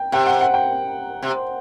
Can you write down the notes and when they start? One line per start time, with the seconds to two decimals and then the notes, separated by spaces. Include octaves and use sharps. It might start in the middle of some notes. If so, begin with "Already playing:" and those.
Already playing: G5
0.12 C3 G5
0.27 F#5
0.41 F#5
0.54 G5
1.23 C3